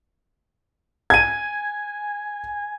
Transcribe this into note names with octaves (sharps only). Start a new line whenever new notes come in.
G#5 G#6 D#7